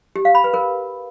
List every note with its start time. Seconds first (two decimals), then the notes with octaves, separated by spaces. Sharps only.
0.16 G4
0.25 F5
0.35 B5
0.44 B4
0.54 A#4